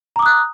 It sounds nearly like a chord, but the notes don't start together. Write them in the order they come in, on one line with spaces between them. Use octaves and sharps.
A#5 D6 D#6 F#6